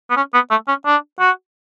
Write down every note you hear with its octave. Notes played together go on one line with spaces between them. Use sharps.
B3
C#4
B3
A3
C#4
D4
F#4